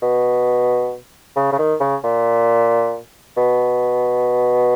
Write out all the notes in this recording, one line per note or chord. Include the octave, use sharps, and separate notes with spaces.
B2
C#3
C#3
D#3
C#3
A#2
B2